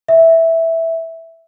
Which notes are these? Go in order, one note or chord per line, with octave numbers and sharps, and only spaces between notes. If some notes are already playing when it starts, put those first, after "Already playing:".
E5